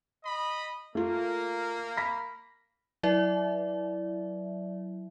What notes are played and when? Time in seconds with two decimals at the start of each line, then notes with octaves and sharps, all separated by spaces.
0.25 D#5 B5
0.95 A3 A#3 F4
1.97 B5 A#6 B6
3.03 F#3 E4 D5 E5